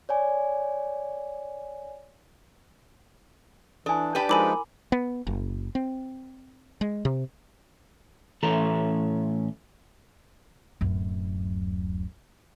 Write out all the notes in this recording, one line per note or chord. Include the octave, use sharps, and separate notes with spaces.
C#5 D5 G#5
E3 D4 A4 G#5
D4 G4 B4
F3 G#3 D#4 E4 A#4 G#5 B5 D6
B3
F#1
C4
G#3
C3
A2 E3 C#4 A4 A#5
D1 F#2